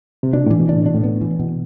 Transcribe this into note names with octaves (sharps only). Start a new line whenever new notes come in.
C3
B2 D4
A2
E3
B2
A2 D4
B2 D4
A2
B3
E3
B2